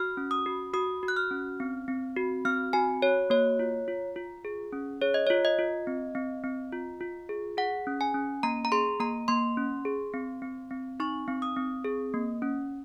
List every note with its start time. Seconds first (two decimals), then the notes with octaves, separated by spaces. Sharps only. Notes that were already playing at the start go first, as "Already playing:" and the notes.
Already playing: F#4 F6
0.17 C#4
0.31 D#6
0.46 F#4
0.74 F#4 D#6
1.03 F#4
1.08 F#6
1.16 F6
1.31 C#4
1.60 C4
1.88 C4
2.16 F#4
2.45 C4 F6
2.73 F#4 G#5
3.02 F#4 C#5
3.30 A#3 C#5
3.59 F4
3.88 F4
4.16 F4
4.45 G#4
4.72 C#4
5.01 G#4 C#5
5.14 D#5
5.27 F4 C#5
5.45 D#5
5.59 F4
5.87 C4
6.15 C4
6.44 C4
6.72 F4
7.01 F4
7.29 G#4
7.57 G#4 F#5
7.87 C#4
8.01 G#5
8.14 C#4
8.43 A#3 A#5
8.65 A#5
8.72 G#4 C6
9.00 A#3 A#5
9.28 A#3 C6
9.57 C#4
9.85 G#4
10.14 C4
10.42 C4
10.70 C4
11.00 D#4 C#6
11.28 C4
11.42 D#6
11.56 C4
11.84 G#4
12.14 A#3
12.42 C#4